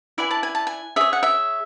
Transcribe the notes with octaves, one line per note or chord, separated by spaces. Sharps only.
E4 B4 D5 G#5
A5
G#5
A5
G#5
G#4 C#5 E5
F#5
E5